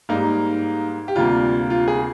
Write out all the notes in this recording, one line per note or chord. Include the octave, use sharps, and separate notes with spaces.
G#2 G3 A#3 D#4
G4
D2 C3 G3 A#3 F4
F4
G#4